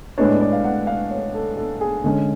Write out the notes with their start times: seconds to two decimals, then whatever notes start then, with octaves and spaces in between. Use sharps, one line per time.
0.18 A2 G#3 B3 D4 C#5
0.29 D5
0.41 D5
0.53 F5
0.64 F#5
0.87 F5
1.11 C#5
1.35 A4
1.57 A4
1.81 G#4
2.04 D3 G#3 C#4